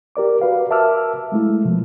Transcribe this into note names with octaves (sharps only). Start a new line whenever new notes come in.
G4 A#4 D5 D6
F#4 B4 F5
A#4 E5 A5 D6 E6 F6
G#3 A3 E4
B2 F3